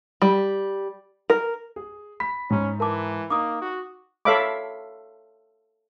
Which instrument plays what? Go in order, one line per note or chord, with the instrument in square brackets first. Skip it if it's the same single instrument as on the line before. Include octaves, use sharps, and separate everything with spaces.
[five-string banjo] G3
A#4
[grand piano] G#4
[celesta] B5 [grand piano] B6
[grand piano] G#2 [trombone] C#4
[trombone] E3 [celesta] A#4 A5 D6
[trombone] A#3 [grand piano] D#4 [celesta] D6 D#6
[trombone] F#4
[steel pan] A4 C#5 E5 F5 B5 D6